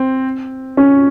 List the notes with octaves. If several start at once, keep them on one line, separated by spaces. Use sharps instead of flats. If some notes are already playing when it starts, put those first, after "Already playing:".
Already playing: C4
C#4